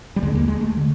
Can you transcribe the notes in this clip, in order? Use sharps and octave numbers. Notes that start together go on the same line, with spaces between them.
G3
D#2 D3 G#3
A#3
G#3
A3
D3